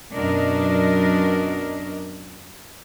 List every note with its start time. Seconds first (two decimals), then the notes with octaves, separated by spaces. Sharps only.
0.15 F#2 B2 D4 A#4 D#5